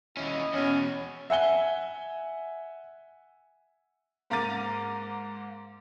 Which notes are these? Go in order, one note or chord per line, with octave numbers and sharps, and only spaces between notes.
D#2 C#4 E4 D#5
E2 B2 C#4
E5 F#5 G#5 G7
G#2 A#3 A#5 D6 A6 D#7